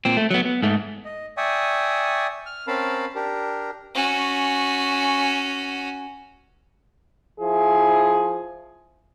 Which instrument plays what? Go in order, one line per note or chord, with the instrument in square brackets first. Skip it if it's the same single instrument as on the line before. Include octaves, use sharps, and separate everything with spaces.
[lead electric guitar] A#2 C4
A3
F#3 B3
B3
G#2 A3
[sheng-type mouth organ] D#5
D5 E5 G5 G#5 C#6 D#6
F6
C4 C#4 A#4 F5 A5 B5
D4 G4 A#4
[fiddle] C#4 F#4
[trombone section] F3 E4 G#4